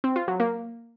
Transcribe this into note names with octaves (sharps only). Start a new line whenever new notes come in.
C4
F4
F#3
A#3